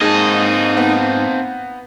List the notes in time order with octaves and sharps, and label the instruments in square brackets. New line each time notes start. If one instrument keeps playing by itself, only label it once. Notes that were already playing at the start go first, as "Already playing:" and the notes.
[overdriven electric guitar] G#2 D#5 [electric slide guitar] A#3 C4 A5 [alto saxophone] D#4 [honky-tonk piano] G#4
[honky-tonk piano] B3